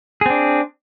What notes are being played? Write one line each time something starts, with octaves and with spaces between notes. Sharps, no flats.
C4 D4 G#4